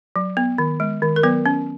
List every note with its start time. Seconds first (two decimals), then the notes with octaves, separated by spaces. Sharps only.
0.16 F#3
0.37 B3
0.58 D#3
0.80 G#3
1.02 D#3
1.16 A#4
1.23 F#3 B3 B4
1.46 C#4